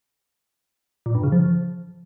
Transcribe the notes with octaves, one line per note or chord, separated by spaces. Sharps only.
A#2
G2
C#3
F3